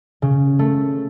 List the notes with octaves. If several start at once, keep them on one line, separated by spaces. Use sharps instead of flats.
C#3
A3